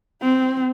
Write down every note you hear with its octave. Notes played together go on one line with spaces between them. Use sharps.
C4